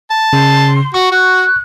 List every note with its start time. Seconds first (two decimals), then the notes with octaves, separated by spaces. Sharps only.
0.10 A5
0.33 C#3 C6
0.94 F#4 C#6
1.11 F#4 F#6